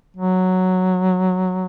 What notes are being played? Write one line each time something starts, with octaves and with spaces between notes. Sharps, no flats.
F#3